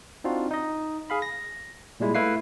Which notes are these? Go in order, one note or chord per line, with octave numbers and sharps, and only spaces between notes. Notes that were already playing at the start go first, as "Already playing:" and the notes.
C4 D4 D#4 F4 F#4
D#4 D#5
G#4 F5 B5
A#6
A#2 G3 G#3 E4
A3 E4 B4 F5 C7